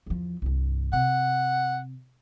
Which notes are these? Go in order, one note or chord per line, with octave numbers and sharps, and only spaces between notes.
E2 F3
C2 G2
C3 F#5